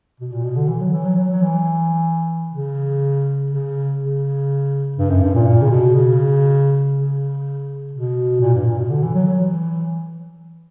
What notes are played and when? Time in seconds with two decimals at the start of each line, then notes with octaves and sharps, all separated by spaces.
0.20 B2
0.32 A#2
0.44 B2
0.56 D3
0.68 E3
0.81 F#3
0.93 E3
1.05 F#3
1.18 F#3
1.30 F#3
1.42 E3
2.52 C#3
3.51 C#3
4.01 C#3
4.98 G2
5.10 F#2
5.23 G2
5.35 A#2
5.48 A#2
5.62 C#3
5.71 B2
5.96 C#3
6.95 C#3
7.93 B2
8.41 A#2
8.54 G2
8.66 A#2
8.78 B2
8.90 D3
9.03 E3
9.14 F#3
9.33 F#3
9.40 E3